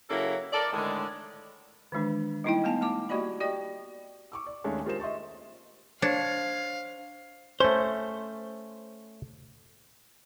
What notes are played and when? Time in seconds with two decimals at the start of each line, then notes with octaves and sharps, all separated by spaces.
0.09 C#3 F#3 A#3 E4 A4
0.52 A4 A#4 D5
0.73 A2 D3 D#3 G#3
1.92 D#3 E3 G#3 D4
2.44 G3 A#3 D#4 E4 D#5 G5
2.64 A3 B3 G#5 A5
2.81 A3 A5 D6
3.09 A#3 F#4 G4 D5 D#5 B5
3.40 F#4 G4 D5 D#5 G5
4.32 C#6 D6 E6
4.47 D5
4.64 D#2 D#3 G#3 A3 C#4 D4
4.85 G#3 F4 G4 A#4 C5 E7
5.00 D#5 E5 C6 C#6 A6
6.02 D4 C5 C#5 F5
7.60 A3 C#4 C5